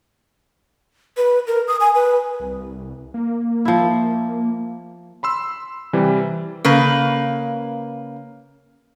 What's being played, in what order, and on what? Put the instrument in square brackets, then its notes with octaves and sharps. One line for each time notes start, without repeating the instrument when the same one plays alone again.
[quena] B4
A#4
D#6
G#5
B4
[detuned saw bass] C2
A#3
[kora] F3 E4
[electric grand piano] B5 C6 E6
C3 E3 G3
[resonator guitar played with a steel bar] C#3 A#3 B4